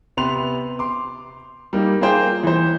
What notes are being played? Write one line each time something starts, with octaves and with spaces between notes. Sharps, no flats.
C3 B3 B4 C6 F7
C6 D6
G3 A#3 D#4
A#3 F4 G#4 C5 G5
E3 C5